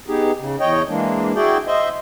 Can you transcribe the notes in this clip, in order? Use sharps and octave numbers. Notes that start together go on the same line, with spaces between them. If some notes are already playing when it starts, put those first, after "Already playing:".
B3 D#4 G4 G#4
C#3
E2 C#5 D#5 G5
E3 G#3 A#3 D4
E4 F#4 G#4 D5 G5
C5 D#5 E5